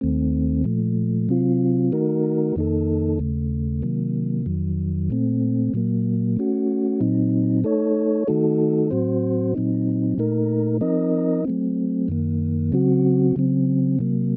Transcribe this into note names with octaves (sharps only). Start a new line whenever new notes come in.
D#2 D#3 A3 C4
A#2 F3 A3
C3 F#3 C4 F4
D#3 A3 D#4 F#4 A#4
F2 D#3 A#3 D#4 A4
D#2 C#3 A3
C3 D#3 F#3 A#3
F2 D#3 F#3
A#2 A3 C4
A#2 F#3 A#3
A3 C#4 F#4
A#2 F#3 C4 D#4
A3 D#4 A4 C#5
D#3 A3 D#4 F#4 A4
A2 F#3 C4 F#4 C5
A#2 F#3 C4 D#4
A#2 A3 D#4 A#4
F3 C4 D#4 A#4 D#5
F#3 A3 C4
F#2 D#3 A#3
C#3 F#3 C4 F#4
C#3 F#3 C4
C3 F#3 A#3